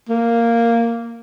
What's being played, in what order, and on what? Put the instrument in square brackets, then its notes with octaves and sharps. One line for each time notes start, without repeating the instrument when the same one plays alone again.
[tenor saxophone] A#3